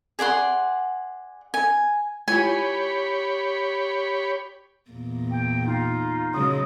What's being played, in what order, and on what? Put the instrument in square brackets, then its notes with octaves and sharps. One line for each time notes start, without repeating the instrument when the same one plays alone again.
[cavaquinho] G#4 D5 F#5 C6
G#5
[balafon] G#3 E4 F4 [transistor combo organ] G4 C#5 B5 [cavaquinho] G#5
[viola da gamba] E2 A#2
[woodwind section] G5
D#4 F4
[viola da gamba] C#3 F#3 G#3 [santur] D#6